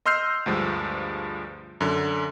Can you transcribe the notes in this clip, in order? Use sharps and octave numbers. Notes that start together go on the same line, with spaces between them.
D#5 C6 E6 F6 G6 C7
D2 G2 F3 G#3
F#2 D3